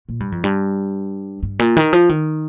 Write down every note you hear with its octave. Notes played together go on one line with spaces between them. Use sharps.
A#2
G2
F2
G2
G2
A#2
D#3
F3
D#3